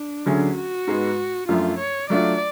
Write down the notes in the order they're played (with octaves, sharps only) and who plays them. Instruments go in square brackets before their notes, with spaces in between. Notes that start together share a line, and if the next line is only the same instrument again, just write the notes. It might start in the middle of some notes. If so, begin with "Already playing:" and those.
Already playing: [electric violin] D4
[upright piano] D2 D3 F#3 C#4 G#4
[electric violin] F#4
[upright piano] G#2 G#3 B3
[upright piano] F#2 F3 A3 D4 [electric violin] F4
[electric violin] C#5
[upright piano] F#3 A3 D4 F4 [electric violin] D5